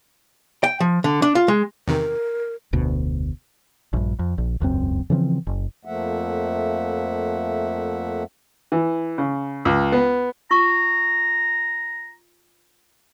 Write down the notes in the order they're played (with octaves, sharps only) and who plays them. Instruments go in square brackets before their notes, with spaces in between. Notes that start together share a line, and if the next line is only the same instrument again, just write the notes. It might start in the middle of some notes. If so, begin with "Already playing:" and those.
[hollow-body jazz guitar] G5
F3
D3
D4
F4
G#3
[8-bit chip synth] E2 C3 D#3 [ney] A#4
[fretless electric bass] F1 D2 B2
[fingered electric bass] A#1 G2
F2
A#1
E1 C#2 F#2 C4
C#3 E3 F3 C4
F#1
[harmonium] F2 F3 A3 A#3 E5 F#5
[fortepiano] E3
C#3
C#2
B3
[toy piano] F4 C#6 [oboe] A#5